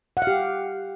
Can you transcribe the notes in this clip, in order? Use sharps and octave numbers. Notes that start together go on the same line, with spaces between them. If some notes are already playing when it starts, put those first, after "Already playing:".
F#5
F5
G4